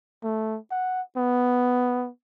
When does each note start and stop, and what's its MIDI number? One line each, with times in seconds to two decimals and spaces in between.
0.24 0.58 57
0.71 1.01 78
1.17 2.09 59